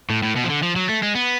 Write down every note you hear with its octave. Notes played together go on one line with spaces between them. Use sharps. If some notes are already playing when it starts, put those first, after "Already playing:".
A2
A2
B2
F3
D3
F3
F#3
A3
G#3
B3